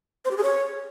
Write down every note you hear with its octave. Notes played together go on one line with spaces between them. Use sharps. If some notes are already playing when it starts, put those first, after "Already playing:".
C5
G4
G#4
C#5